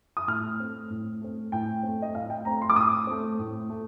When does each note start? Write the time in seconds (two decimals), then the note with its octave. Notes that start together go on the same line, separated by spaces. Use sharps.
0.17 D#6
0.28 A2 F6
0.59 A3 C4
0.90 A2
1.21 A3 C4
1.52 A2 G5
1.83 A3 C4
2.02 D#5
2.15 A2 F5
2.30 G5
2.45 A3 C4 A#5
2.62 C6
2.70 D6
2.76 A2 D#6
3.07 A3 C4
3.39 A2
3.70 A3